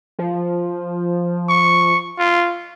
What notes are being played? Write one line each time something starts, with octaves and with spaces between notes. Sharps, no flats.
F3
C#6
F4